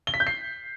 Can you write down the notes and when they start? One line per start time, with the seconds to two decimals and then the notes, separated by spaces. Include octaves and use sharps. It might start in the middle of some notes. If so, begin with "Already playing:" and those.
0.07 G7
0.14 B6
0.20 G6
0.27 C7